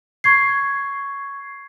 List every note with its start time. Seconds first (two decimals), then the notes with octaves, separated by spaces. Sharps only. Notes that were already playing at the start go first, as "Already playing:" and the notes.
0.24 C#6 G#6 C7